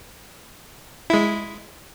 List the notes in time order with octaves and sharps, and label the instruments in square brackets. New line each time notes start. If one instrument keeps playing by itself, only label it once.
[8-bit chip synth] G#3 E4